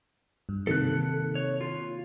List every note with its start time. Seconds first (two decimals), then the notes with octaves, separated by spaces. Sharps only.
0.49 G2
0.67 C3 D#3 A#3 A4 F#6
1.35 C#5
1.61 F4